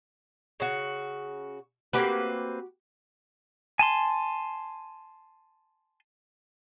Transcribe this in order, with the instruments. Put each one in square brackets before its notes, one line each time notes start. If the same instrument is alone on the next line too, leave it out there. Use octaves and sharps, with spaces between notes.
[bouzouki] C#3 F#4
[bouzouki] A#3 C4 B4 [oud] F#4 G4
[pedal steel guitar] G#5 A5 C6